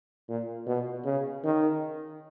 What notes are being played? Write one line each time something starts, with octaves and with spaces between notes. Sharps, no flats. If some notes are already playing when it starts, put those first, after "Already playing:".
A#2
B2
C#3
D#3